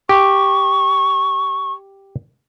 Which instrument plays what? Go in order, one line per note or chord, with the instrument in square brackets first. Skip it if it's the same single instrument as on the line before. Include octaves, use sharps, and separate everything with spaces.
[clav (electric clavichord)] G4 [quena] C#6